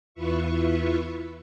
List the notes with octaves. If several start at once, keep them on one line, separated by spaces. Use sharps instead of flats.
E2 E4 F4 B4 E5 C#6